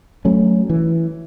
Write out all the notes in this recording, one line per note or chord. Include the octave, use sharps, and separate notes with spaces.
F#3 A3 C#4
E3